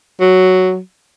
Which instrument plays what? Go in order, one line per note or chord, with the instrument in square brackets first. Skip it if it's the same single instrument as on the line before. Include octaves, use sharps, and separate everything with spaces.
[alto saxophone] F#3